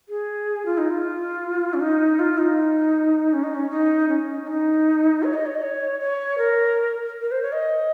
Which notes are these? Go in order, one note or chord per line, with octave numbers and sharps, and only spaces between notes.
G#4
F4
D#4
F4
C#4
D#4
F4
D#4
C#4
D#4
C#4
D#4
C#4
C#4
D#4
C#5
D#5
C#5
D#5
C#5
C#5
A#4
A#4
C5
C#5
D#5